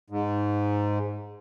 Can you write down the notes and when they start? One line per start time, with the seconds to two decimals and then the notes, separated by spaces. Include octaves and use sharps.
0.10 G#2